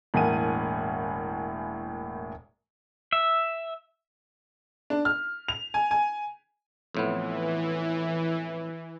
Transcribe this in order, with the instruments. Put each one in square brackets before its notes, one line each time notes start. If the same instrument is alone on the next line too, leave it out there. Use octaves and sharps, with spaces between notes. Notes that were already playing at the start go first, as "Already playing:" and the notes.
[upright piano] E1 A2 A#3 F#5 G#5 D#7
[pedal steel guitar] E5
[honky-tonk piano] D4
F6
F7
G#5
G#5
[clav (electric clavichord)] F2 A2 B3 [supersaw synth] E3